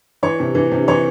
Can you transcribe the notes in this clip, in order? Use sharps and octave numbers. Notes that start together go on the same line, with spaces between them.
E3 C#5
C3
E3
C3
E3 C#5